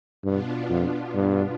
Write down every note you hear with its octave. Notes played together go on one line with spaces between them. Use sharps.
G2 B2 B3 D4 F4
F2
G2